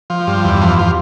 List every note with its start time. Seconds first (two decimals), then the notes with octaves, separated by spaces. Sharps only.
0.10 F3
0.27 G2
0.44 E2
0.61 F3
0.79 F3